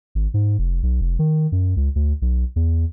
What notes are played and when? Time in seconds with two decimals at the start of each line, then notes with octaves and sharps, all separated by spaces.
0.15 G#1
0.34 G#2
0.59 F1
0.83 B1
1.01 F1
1.19 D#3
1.52 F#2
1.77 C#2
1.96 D2
2.22 B1
2.56 E2